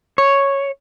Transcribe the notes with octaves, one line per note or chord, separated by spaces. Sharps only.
C#5